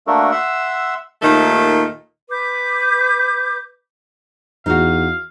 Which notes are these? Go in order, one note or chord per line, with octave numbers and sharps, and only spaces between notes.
A3 A#3 D4 F#4 A4 A#4
E5 F#5 C6 E6
D#2 A#2 D#3 A3
B4 D6 G6
E2 D#4 F#4 F5